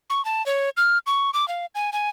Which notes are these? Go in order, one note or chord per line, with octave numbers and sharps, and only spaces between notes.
C#6
A5
C#5
F6
C#6
D6
F5
G#5
G#5